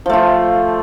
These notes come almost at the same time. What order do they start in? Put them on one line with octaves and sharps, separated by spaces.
F3 A3 F4